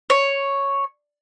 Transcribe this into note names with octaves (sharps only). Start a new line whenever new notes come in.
C#5